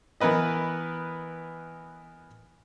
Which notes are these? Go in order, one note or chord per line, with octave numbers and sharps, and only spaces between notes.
E3 B3 A#4 B4 D#5